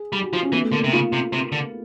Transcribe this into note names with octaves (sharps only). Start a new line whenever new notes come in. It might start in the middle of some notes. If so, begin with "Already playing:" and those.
Already playing: G#4
G3 G4
F#4
F3 F4
C#4
E3 B3
A3
D3 A#3
C3
C#3 F4
C3
C3
D3